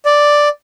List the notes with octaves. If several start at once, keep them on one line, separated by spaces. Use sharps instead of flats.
D5